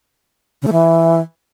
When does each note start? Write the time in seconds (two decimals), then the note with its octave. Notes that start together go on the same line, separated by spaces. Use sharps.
0.62 C#3
0.67 A3
0.72 E3